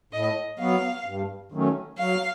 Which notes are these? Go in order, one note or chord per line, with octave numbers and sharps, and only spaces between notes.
A2 D#5
F#3 B3 F5
G2
D#3 F#3 A3 C#4
F#3 F5